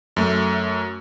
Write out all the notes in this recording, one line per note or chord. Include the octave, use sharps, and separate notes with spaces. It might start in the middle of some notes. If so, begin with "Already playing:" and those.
F#2 A3